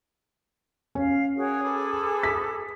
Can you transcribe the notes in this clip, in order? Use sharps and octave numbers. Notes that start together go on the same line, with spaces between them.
C#4 F5
F#4 G#4 A#4 C#5
A4 B4 D6
B6